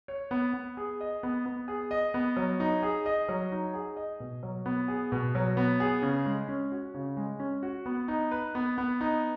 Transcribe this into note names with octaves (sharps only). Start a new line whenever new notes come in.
C#5
B3
B3
G#4
D#5
B3
B3
G#4
D#5
B3
F#3
D#4
G#4
D#5
F#3
D#4
G#4
D#5
B2
F#3
B3
G#4
B2
F#3
B3
G#4
C#3
G#3
C#4
F#4
C#3
G#3
C#4
F#4
B3
D#4
B4
B3
B3
D#4